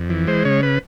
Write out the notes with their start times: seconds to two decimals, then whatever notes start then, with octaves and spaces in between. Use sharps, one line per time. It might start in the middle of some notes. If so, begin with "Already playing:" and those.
Already playing: F2
0.10 E3
0.27 G#3 C5
0.45 C#3 C#5
0.63 B4